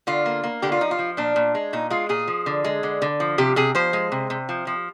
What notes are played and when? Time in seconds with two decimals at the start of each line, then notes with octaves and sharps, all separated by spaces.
0.07 D3 F4
0.26 A#3
0.44 A#3
0.62 D3 G4
0.72 F4
0.81 F3 D#4
0.91 F4
0.99 F3
1.17 A#2 D4
1.36 A#2
1.55 G#3
1.73 A#2 D#4
1.90 G#3 F4
2.09 A#2 G#4
2.27 F3
2.46 D3
2.64 G#3
2.83 D3
3.02 D3
3.20 F3
3.38 C3 G4
3.56 C3 G#4
3.75 F3 C5
3.93 G#3
4.12 C3
4.30 C3
4.49 F3
4.67 F3